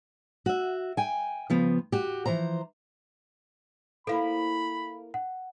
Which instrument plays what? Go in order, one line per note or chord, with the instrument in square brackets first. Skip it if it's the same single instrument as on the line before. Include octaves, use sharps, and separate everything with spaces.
[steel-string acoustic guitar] F#4 E5
G5 G#5
C#3 F3 B3
F#4 G4
E3 F3 C5 A#5
[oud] A#3 E4 C5 [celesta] A4 F5 [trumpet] B5
[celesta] F#5